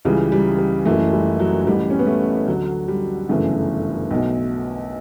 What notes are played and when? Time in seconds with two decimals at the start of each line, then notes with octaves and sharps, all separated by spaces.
0.05 C#2 C#3 E3 G3
0.32 G3
0.59 G3
0.85 F#1 F#2 E3 A3
1.13 G3
1.40 F#3
1.66 A1 A2 E3 G3
1.90 C#4
1.99 B3
2.07 A3
2.47 D2 D3 F#3
2.88 G3
3.29 G1 F#2 C#3 E3 A3
4.11 B1 B2